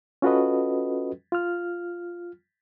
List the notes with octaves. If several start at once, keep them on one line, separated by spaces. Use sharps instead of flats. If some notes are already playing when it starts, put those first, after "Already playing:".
C#4 F4 F#4 A4 B4 D#5
F4 F6